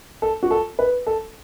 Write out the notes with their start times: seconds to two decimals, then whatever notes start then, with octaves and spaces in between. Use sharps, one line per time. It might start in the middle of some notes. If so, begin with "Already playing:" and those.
0.22 A4
0.43 F#4
0.51 A4
0.79 B4
1.07 A4